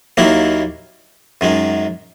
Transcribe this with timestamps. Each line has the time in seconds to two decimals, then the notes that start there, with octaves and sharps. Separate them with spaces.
0.17 D#2 D#3 F#3 A#3 E4
1.41 F#2 D#3 G#3